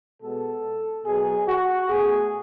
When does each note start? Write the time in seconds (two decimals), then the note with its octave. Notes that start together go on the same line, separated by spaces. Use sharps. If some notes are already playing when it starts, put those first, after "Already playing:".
0.22 B2 G#3 B3 A4
1.05 B2 F#3 B3 G#4
1.47 F#4
1.88 B2 A3 G#4